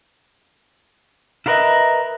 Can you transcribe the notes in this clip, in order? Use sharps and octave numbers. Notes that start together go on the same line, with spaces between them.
E4 F4 A#4 B4 D#5 E5